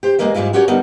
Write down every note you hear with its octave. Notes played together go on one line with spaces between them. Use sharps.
G4 C5
E2 G#2 G#3 A#3 A#4 E5
G#2 G3 G#3 E4 F4
C#4 F#4 G4 A#4 C#5 D5
D3 G3 B3 D#4 A#4